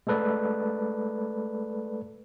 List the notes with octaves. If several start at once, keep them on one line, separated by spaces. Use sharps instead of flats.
G#3 A3 A4 B4 D5